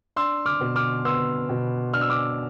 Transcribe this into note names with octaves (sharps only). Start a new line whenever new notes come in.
D4 C6 E6
D6 F6
B2
D6 F6
B3 C6 E6
B2
D4 F6
E6
D6 F6